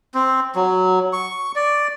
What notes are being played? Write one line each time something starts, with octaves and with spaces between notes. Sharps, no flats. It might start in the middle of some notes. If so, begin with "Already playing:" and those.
C4
F#3
C#6
D5